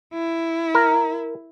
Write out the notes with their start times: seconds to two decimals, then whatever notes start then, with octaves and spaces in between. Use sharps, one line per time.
0.14 E4
0.75 A#4